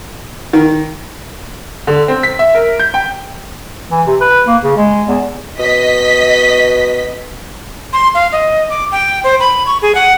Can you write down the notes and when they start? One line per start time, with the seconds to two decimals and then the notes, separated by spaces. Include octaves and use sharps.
0.53 D#3
1.87 D3
2.08 C4
2.23 B6
2.39 E5
2.55 A#4
2.80 G6
2.94 G5
3.91 E3
4.07 C3
4.21 B4
4.47 A#3
4.63 C#3
4.77 G#3
5.08 E2
5.59 B2 D#5 B6
7.93 C6
8.15 F5
8.32 D#5
8.70 D6
8.92 G5
9.24 C5
9.40 B5
9.67 C#6
9.82 G#4
9.95 F#5